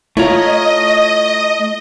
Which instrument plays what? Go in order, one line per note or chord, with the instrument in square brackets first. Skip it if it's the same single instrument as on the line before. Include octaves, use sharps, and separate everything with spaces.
[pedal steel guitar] A3 C#5 A#5 [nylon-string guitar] E4 F4 [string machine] D#5